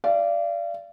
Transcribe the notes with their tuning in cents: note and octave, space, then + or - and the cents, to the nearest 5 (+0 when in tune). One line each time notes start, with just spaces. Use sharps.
D5 -5 F5 -40